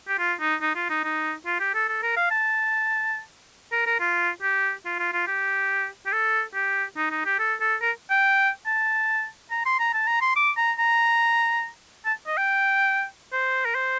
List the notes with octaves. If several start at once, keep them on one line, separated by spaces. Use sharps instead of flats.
G4
F4
D#4
D#4
F4
D#4
D#4
F4
G4
A4
A4
A#4
F5
A5
A#4
A#4
F4
G4
F4
F4
F4
G4
G4
A4
G4
D#4
D#4
G4
A4
A4
A#4
G5
A5
A#5
C6
A#5
A5
A#5
C6
D6
A#5
A#5
A5
D#5
G5
C5
A#4
C5